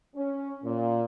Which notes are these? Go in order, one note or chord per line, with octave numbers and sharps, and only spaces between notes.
C#4
A#2